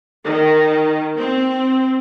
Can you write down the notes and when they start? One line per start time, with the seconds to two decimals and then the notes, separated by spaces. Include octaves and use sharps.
0.25 D#3
1.18 C4